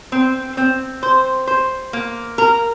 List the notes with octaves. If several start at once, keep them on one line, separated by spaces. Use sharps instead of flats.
C4
C4
C5
C5
A#3
A#4